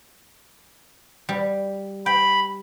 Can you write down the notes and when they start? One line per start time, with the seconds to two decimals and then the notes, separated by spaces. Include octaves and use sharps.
1.29 G3
2.06 G5 B5